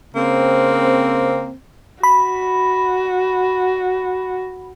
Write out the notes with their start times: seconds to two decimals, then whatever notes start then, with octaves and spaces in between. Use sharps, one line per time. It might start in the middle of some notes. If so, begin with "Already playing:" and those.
0.15 C#3 A#3 C4
2.03 F#4 B5